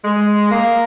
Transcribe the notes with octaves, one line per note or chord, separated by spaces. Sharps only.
G#3
A#3